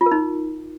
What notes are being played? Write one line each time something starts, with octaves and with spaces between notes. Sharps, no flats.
F4
A#4
D#4